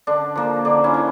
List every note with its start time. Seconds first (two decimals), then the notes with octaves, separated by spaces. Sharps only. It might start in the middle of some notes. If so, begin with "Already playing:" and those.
0.07 D3 D4
0.35 F3 A#3
0.65 D3 D4
0.84 C#4 E4
0.94 F3